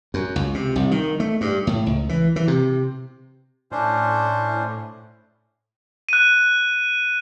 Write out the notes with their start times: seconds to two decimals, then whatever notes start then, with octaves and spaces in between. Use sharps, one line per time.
0.14 F#2
0.36 C#2
0.54 C3
0.76 C2
0.91 D#3
1.20 A3
1.41 G2
1.67 A2
1.86 C#2
2.09 E3
2.36 E3
2.48 C3
3.72 A2 C#4 D4 C5
6.09 F#6 D#7